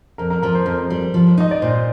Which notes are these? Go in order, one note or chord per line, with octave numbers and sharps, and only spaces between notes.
F2 A#4
A#4
F3 A#4
C5
F2 A#4
G3
F3
D#4 D#5
D5
A#2 C5